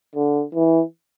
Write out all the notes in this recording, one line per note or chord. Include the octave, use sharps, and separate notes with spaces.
D3
E3